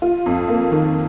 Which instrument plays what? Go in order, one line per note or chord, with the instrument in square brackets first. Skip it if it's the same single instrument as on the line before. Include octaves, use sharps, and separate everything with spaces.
[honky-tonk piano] F4
F2
A#3
D#3